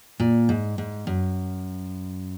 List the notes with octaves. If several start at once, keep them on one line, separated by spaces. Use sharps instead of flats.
A#2
G#2
G#2
F#2